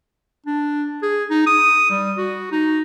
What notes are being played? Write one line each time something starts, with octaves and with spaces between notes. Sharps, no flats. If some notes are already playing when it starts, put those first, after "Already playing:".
D4
G#4
D#4
D#6
G3
F#4
D#4